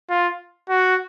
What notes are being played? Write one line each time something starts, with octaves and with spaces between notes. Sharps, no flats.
F4
F#4